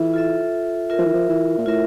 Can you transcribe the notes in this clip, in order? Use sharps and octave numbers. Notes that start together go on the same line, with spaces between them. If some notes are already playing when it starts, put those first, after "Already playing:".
Already playing: E3 F4 A4 E5
F4 A4 E5
F4 A#4 E5
F3
E3
F3
E3
A#2
A2 F4 A#4 E5